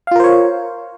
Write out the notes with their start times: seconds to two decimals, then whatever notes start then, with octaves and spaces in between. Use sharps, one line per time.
0.07 F5
0.11 F4
0.16 A#4
0.20 C5
0.24 C#5